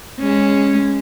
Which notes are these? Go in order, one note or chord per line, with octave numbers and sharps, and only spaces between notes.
G#3 C#4